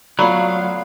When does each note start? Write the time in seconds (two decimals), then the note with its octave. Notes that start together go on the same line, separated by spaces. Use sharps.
0.19 F#3 A3 B3 F4 D5 F5 A#5 B5